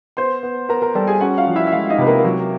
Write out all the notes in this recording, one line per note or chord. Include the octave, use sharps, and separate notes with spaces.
B3 C5 C6
B3
B3 A#4 A#5
A#4 A#5
G3 A4 A5
G#4 G#5
C#4 F#4 F#5
F4 F5
F3
E4 E5
E5
G#3 F4 F5
D#4 D#5
C3 B4
A#3 A#4
F#3